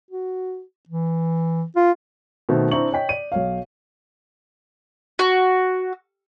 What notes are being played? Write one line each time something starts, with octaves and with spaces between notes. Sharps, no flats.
F#4
E3
F4
B2 D#3 A3 C4
C4 D4 E4 A#5 C#6 F#7
C#5 D#5 G5 B6
D5 D#7
B1 C#5 F5
F#4